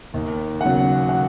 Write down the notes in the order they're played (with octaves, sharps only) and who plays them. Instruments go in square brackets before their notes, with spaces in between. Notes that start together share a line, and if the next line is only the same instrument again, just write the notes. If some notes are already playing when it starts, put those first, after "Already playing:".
[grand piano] D#2
[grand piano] C#3 F#3 [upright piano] F#5
[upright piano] F#5